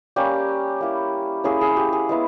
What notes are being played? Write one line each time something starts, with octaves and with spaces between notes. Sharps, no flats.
G3 A#3 C#4 G4
A#3 E4
A#3 C#4 E4 G#4
G#4
G4
G#4
G#3 B3 E4